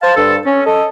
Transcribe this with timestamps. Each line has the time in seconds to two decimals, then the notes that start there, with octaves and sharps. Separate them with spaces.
0.02 C5 F5 A5
0.16 G2 A4
0.46 C#4
0.66 A4 D#5